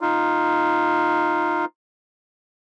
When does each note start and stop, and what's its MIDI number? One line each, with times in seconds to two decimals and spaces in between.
0.01 1.65 63
0.01 1.65 65